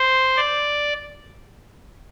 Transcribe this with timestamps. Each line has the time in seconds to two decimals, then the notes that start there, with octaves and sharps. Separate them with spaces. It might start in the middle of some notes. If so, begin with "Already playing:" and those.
Already playing: C5
0.37 D5